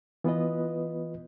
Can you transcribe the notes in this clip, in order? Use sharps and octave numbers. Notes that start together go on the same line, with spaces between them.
E3 B3 F4 B4 D#5